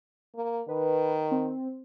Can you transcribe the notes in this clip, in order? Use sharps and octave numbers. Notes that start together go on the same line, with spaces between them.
A#3
D#3 B4
C4